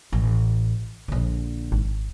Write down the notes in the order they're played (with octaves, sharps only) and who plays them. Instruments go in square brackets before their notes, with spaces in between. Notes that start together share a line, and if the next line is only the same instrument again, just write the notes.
[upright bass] A1
A#1 D3
[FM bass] G#1